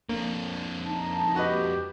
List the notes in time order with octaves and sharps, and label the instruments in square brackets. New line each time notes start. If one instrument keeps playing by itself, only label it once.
[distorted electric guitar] F2 D3 [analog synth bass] A#3
[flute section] D#4 A5
[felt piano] F#4 B4 D#5 [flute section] G4